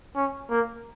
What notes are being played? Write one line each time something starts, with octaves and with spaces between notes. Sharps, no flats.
C#4
A#3